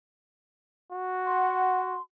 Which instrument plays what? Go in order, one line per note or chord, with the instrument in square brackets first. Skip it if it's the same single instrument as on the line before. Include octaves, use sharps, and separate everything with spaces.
[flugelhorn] F#4
[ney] F#5 [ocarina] C6